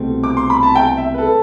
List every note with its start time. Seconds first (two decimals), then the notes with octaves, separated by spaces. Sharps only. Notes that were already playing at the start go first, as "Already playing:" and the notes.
Already playing: C2 B2 A3 C4
0.24 D6
0.37 C6
0.50 B5
0.63 A5
0.75 G5
0.97 E5
1.14 B4
1.18 A4